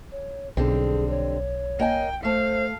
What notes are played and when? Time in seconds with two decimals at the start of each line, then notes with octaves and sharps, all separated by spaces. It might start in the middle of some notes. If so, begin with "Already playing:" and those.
0.11 C#5
0.57 B1 D3 G3 C4 G#4
1.10 C#5
1.79 A#3 D#5 G5 G#5
2.25 A3 C5 F5